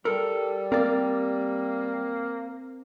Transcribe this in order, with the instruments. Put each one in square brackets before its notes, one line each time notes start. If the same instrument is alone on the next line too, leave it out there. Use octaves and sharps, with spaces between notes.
[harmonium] G3 [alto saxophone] A4 [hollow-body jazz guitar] A#4
[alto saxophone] A#3 [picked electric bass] C4 [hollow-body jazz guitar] A#4 D5